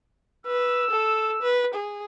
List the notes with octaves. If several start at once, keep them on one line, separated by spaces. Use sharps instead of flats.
B4 E6
A4
B4
G#4